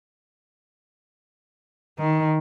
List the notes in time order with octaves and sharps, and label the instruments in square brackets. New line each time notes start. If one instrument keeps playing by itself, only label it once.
[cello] D#3